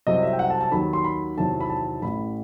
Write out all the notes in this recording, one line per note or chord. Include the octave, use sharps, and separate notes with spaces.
C2 C3 F#3 D#5
E5
G5
F#5
A5
A5
D#2 D#3 F#3 B5
C6
B5
E2 C3 D#3 F#3 A5
B5
A5
A1 A2 E3 B5